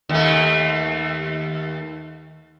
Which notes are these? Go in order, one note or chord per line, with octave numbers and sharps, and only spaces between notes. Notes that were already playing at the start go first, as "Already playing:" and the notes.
D#2 A3